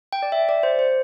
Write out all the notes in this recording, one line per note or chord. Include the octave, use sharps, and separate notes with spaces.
G5
D5
E5
D5
C5
C5